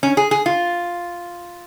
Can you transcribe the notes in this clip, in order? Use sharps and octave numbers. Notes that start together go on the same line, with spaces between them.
C#4
G#4
G#4
F4